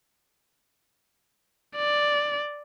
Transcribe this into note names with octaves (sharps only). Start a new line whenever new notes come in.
D5